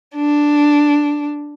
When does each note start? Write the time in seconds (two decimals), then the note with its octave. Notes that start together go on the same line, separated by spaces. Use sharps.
0.16 D4